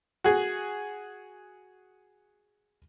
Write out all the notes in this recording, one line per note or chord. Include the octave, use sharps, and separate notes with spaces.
F#4 G#4